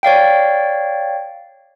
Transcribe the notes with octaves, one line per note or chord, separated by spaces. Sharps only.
C#5 D5 F5 G5